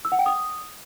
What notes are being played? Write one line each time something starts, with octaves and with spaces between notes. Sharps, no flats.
E6
F#5
G5
D#6